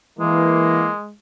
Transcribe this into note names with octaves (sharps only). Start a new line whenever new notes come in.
E3 G#3 A#3